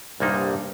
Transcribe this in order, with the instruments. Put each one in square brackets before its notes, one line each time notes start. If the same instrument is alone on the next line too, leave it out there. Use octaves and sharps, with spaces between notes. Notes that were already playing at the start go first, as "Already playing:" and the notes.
[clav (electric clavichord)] C2 A#2 G3 A#3 D#4 [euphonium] G2